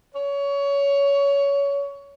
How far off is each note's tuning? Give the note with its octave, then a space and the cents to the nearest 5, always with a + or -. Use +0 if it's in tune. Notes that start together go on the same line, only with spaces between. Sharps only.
C#5 +20